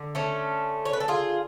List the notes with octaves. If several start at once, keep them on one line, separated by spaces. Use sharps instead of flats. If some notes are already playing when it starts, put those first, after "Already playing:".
Already playing: D3
A3 C#4
C#5
B4
A4
F4 G#4